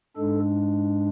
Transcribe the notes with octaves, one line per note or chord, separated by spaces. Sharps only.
G#2 G#3 D4 A4